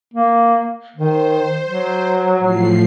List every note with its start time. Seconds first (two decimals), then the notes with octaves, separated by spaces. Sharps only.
0.14 A#3
0.96 D#3 C5
1.66 F#3
2.38 A2 F3 C7